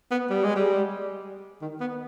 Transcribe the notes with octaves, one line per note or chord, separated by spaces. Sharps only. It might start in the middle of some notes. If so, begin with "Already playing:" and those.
B3
G3
G#3
G3
D#3
B3